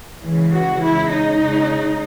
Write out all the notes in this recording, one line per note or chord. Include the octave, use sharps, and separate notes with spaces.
C#3 E3 G#3
F#4
C#3 G#3 E4
D#4
C#3 G#3